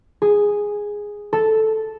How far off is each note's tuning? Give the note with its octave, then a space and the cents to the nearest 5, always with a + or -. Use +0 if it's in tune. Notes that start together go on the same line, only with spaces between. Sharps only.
G#4 -5
A4 -5